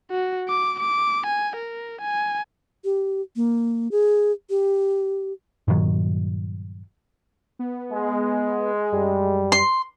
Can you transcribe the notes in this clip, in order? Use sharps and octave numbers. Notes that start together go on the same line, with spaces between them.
F#4
D6
D6
G#5
A#4
G#5
G4
A#3
G#4
G4
G2 A#2 D#3 F#3
B3
G#3
F#2 G3
C6